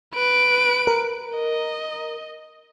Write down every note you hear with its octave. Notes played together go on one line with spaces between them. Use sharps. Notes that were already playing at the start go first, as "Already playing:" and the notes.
B4 D7
A#4
D#5